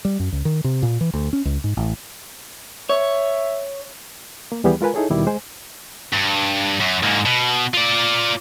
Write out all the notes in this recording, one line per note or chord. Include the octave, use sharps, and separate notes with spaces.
G3
F#2
C#2
D#3
C3
A#2
E3
D2
C#4
C#2
G#2
A1
C#5 E5
A#3
D#2 E3 G3 B3 G4 G#4
G#3 F4 A#4 B4 G#5
D#4 E4 G#4 A4 C#5
D#2 B2 D#3 G3 E4 D6
G#3 C5 G#5
G2
F#2
G#2 A#3
B2
F4 D5